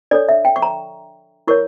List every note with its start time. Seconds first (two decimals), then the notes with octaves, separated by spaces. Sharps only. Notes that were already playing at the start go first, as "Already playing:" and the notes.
0.11 D4 A4 C#5 D5
0.29 E5
0.45 G5
0.56 C#6
0.62 A#5
1.47 E4 A#4 C#5 C#6